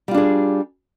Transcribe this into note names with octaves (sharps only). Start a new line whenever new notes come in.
G3 D4 F4 G#4